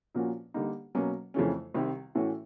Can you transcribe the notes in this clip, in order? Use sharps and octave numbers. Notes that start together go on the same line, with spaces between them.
A#2 F3 A#3 C#4 F#4
D3 G3 A#3 D#4
B2 F#3 A#3 C#4
F2 C#3 E3 A3 C#4
C2 C3 D#3 G3
A2 E3 A3 C#4 F#4